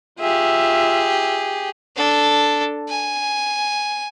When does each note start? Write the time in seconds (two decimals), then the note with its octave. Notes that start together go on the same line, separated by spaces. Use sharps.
0.20 F4 G4 G#4 E5
1.96 D4 A4
2.89 G#5